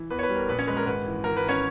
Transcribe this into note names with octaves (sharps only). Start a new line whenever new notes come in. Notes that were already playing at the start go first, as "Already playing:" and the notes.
Already playing: E3
E2 B4
C#5
B4
G3
A#4
A#1 B4
C#4 C#5
G#3 B4
A#4
G#1 B4
E3
G#1 A#4
B4
D#3
C#4 C#5